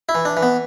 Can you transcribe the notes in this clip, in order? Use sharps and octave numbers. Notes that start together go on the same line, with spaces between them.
E4
E3
D4
E3
B3